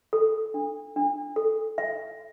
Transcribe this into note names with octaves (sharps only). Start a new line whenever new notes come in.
A4
D4
D4
A4
E5